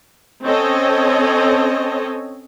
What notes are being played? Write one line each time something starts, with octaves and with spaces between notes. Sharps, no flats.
C4 C#4 A4 C#5 D#5